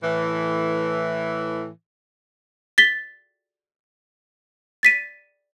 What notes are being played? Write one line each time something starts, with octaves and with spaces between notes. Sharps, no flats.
A2 E3
A6 B6 G7
A6 B6 D#7